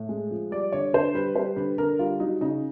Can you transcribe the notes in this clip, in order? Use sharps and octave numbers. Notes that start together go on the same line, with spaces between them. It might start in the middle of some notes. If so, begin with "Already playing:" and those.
Already playing: A2
G#3
F3
G3 D5
D3 C#5
D3 C5
G3 B4
G3 C5
D3 B4
D3 A#4
G3 F4
F#3 D#4
C#3 D#4